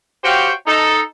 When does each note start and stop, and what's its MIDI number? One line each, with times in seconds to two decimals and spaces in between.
0.23 0.51 66
0.23 0.51 67
0.23 0.51 72
0.23 0.51 73
0.23 0.51 77
0.23 0.51 79
0.66 1.01 63
0.66 1.01 69